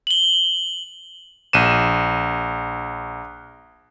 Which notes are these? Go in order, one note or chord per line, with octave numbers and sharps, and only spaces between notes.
F#7 G7
A#1 D#7 E7